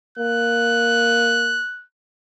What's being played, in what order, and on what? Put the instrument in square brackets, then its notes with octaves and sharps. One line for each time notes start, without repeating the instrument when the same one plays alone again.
[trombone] A#3 [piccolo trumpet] F#6